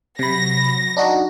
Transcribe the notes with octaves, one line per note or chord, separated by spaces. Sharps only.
C3 F#3 B5 A#6
D4 D#4 F#4